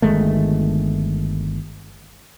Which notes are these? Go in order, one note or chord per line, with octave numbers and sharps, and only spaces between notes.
G1 D#3 G#3 A3